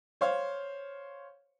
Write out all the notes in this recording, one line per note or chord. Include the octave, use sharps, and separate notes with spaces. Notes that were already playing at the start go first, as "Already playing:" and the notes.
C5 C#5 F5